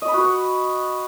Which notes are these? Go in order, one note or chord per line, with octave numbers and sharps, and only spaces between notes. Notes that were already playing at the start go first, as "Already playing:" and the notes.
D#5
B5
F#4
B4